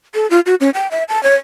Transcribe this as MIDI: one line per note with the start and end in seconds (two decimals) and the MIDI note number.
0.15 0.29 69
0.30 0.40 65
0.46 0.55 66
0.61 0.70 61
0.74 0.88 79
0.91 1.04 76
1.09 1.22 81
1.23 1.35 73